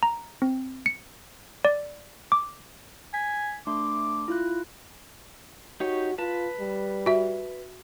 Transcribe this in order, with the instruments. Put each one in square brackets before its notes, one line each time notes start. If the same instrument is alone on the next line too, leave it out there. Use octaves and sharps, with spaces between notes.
[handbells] A#5
C4
C#7
D5
D6
[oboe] G#5 [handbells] B6
[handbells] A3 D4 C6 [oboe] D6
[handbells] E4 F4 F#6
[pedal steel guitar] D#4 G4 C#5 [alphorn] F#4
[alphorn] F4 [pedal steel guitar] B4 A5
[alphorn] G3
[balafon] F#4 E5